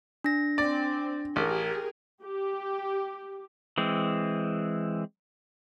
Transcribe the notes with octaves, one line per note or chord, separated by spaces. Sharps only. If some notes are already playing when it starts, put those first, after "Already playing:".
D4 A#6
C4 D5
A1 G4 G#4 A#4
G4
E3 G#3 C4